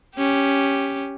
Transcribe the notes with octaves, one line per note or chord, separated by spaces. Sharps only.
C#4 G4